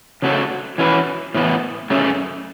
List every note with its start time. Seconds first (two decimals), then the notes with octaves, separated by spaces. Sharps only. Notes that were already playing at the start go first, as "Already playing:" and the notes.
0.22 C#3 A3 F#4 A4 C#5
0.78 E3 C#4 F#4 B4
1.34 A2 E3 B3
1.90 F#2 C#3 A3 C#4